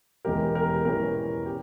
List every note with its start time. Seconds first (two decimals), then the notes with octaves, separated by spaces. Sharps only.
0.25 E1 E2 E3 G#3 C#4 G4 A#4
0.55 G4 A#4
0.85 E1 E2 E3 G#3 C#4 G4 A#4
1.46 G4